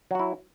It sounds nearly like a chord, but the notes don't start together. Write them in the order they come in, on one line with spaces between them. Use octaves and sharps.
F#3 F#4 E4